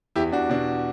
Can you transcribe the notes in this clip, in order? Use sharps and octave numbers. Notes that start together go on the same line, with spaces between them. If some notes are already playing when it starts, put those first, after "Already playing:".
E2 E4 G4
E2 D4 F#4
B2 D4